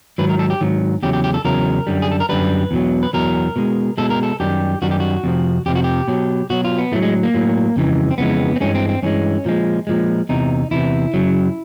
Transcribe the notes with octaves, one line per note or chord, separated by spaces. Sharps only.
G#2 D#3 F#3 B4
A#4
A4
G4
G#2 D#3 F#3
E2 C#3 F#3 G4
G4
G4
A4
E2 C#3 F#3 A#4
F#2 D3 G3
G#4
A4
A#4
F#2 D3 G3 B4
E2 B2 F#3
B4
E2 B2 F#3 A#4
B2 G#3
B2 G#3 A4
A#4
A4
F#2 D#3 G3 G4
F#2 D#3 G3 F#4
G4
F#4
F2 C3 F3
F2 C3 F3 G4
F#4
G4
B2 F#3
B2 F#3 F#4
F4
B3
A2 F#3 A3
G#3
A#3
A2 F#3
F2 C#3 E3 G#3
C4
F2 C#3 E3 G#3 B3
C4
G2 E3 G#3 C#4
C4
C4
G2 E3 G#3 C#4
A#2 F3 G#3
A#2 F3 G#3
E2 C3 E3 D#4
E2 C3 E3 E4
F#2 C#3 F#3